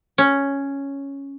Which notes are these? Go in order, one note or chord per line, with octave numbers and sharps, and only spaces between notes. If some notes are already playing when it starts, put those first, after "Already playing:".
C#4